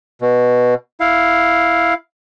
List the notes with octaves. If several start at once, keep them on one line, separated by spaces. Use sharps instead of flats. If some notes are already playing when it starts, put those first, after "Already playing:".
B2
E4 F5